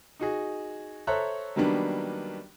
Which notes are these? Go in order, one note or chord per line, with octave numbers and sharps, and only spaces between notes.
D#4 F#4 G#4
A4 C5 C#5 E5 A#5 F#6
D#3 F#3 G3 A#3 B3 D4